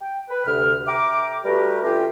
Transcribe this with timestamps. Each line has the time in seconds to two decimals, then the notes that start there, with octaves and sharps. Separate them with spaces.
0.01 G5
0.29 B4
0.46 D2 C3 F6
0.87 E5 G5 A#5 D6
1.44 G3 A3 F#4 G4 A#4 B4
1.84 D3 A3 C#4 F4 G4